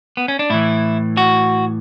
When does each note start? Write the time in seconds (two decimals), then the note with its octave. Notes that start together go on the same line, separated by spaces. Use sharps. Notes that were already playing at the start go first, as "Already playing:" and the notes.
0.17 B3
0.28 C#4
0.39 D4
0.50 A2 E3 E4
1.17 F#4